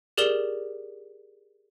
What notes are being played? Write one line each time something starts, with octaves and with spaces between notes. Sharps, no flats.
G4 G#4 A#4 D5 E7 G7